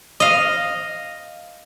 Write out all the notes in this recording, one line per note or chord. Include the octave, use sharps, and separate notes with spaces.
D#5 F5